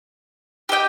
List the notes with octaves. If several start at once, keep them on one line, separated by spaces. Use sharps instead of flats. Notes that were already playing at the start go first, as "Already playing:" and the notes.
G4 D#5 G5